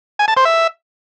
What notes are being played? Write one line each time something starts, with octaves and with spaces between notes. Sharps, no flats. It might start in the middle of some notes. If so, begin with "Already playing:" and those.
G#5
A5
C5
E5